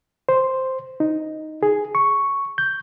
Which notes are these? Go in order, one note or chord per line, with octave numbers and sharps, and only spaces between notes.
C5
D#4
G#4
C#6
G6